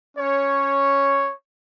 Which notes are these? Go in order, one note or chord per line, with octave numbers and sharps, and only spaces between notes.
C#4 C#5